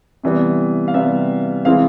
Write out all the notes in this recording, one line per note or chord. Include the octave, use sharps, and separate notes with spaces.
C3 E3 G3 B3
F5
C3 E3 G3 B3 E5
C3 E3 G#3 C4 E4 F5